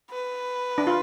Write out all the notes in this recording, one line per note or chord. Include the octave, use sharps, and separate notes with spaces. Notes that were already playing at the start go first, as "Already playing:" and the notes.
B4
D4
F4